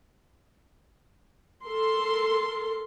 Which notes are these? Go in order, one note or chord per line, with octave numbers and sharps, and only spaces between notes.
A4 A#4 C6